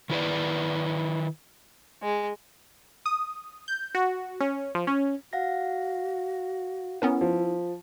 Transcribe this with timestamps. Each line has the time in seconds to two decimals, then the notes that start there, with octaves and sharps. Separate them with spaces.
0.10 D#3 E4 B4 D5
2.03 G#3
3.06 D#6
3.68 G6
3.95 F#4
4.40 C#4
4.75 F3
4.87 C#4
5.33 F#4 F5 F#5 A#6
7.02 B3 C#4 E4 A#4
7.21 F3